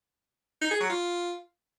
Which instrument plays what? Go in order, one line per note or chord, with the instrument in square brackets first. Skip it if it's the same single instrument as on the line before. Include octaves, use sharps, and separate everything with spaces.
[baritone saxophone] D#4
G#4
F#3
F4